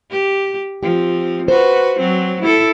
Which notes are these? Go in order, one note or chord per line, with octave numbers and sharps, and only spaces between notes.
G4
F3 C4 G4
F#4 B4 C5
F#3 C4
E4 A4